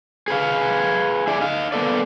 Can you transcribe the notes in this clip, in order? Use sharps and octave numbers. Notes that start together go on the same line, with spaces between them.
G#4 B4 F5
E4 G#4 D5
D#4 F5
A#3 B3 A4 D5